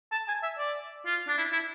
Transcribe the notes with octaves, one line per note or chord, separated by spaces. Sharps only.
A5
G#5
E5
D5
F4
D4
E4
E4